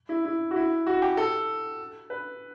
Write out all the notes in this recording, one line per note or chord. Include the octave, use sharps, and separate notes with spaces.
E4
E4
F#4
E4
F#4
G4
A4
B4